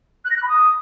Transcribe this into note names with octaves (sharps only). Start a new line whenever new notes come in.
F#6
A#6
F#6
B5
D#6